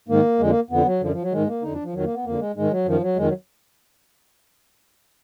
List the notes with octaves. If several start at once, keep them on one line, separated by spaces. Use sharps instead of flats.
G#2 D#3 A#3
F2 D3 G#3
A#3
F2 D3 B3
F#3
F#2 D3 F3
F3
F#3
G#2 D#3 G#3
A#3
F2 D3 D#4
D4
F3
F2 D#3 F#3
A#3
B3
F2 D3 A#3
G#3
G#2 D#3 G#3
F#3
F#2 D#3 F3
F#3
F2 D#3 G#3
F#3